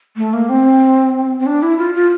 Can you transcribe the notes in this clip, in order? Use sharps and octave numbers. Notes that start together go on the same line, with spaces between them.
A3
A#3
C4
C4
D4
E4
F4
F4